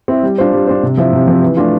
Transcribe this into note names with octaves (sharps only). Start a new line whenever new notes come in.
C4 E4
G3
D4 F4 C5
G3
D4 F4 C5
C3
F3 C4 E4
C3
F3 C4 E4
E3
A3 D4 F4